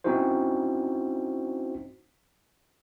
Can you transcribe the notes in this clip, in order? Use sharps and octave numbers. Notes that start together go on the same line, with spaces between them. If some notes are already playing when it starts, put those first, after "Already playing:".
C4 C#4 D#4 E4 F#4 C5